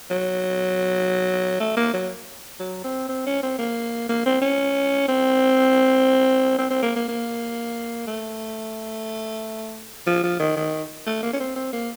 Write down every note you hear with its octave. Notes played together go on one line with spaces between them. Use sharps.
F#3
A3
A#3
F#3
F#3
C4
C4
C#4
C4
A#3
A#3
C4
C#4
C4
C4
C4
A#3
A#3
A#3
A3
F3
F3
D#3
D#3
A3
A#3
C#4
C4
C4
A#3